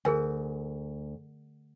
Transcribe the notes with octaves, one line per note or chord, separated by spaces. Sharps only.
D2 G#4 A#4 G#5